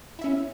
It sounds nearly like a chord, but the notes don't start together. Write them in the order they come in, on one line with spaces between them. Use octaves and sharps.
E4 E5 C#4